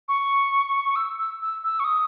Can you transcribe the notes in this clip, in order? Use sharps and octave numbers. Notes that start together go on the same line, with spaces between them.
C#6
E6
E6
E6
E6
C#6
D#6